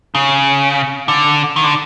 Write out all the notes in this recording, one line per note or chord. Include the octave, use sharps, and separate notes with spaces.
C#3
D3
D#3
D3